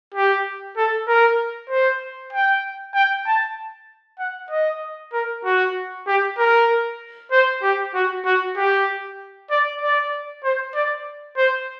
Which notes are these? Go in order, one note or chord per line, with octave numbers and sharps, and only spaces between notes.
G4
A4
A#4
C5
G5
G5
A5
F#5
D#5
A#4
F#4
G4
A#4
C5
G4
F#4
F#4
G4
D5
D5
C5
D5
C5